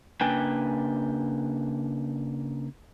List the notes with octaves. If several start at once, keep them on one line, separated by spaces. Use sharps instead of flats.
C#3 A#3 D4 B4 G5 G#5